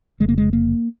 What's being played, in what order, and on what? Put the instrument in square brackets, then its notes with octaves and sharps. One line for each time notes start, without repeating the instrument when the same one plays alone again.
[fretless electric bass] F1 F2 C#3 G#3
A#3
G#3
A#3